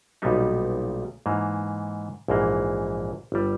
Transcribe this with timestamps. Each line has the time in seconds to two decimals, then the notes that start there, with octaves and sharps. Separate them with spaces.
0.22 B1 A#2 G3 B3 D#4
1.26 G#2 E3 A#3
2.28 A#1 G#2 E3 A#3
3.32 G1 G3